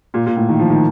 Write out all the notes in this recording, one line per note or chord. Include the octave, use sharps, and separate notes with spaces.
A#2
A#2
A2
D#3
F3
D#3